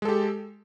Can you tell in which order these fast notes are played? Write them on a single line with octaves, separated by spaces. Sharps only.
G#3 A4 G4